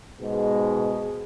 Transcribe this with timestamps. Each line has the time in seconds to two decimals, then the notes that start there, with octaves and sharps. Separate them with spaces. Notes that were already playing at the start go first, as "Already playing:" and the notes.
0.20 G#2 B2 G#3